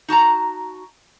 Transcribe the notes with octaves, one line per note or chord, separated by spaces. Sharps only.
D#4 F#4 A5 A#5